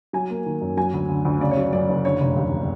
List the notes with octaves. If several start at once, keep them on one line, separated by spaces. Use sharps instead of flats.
F#3 G#5
A#3
D#3
F#2
F#3 G#5
D2
D3
D2
C#3 D5
C#5
F#3 D5
F#2 D5
F#1
D3 C#5
F1
D#2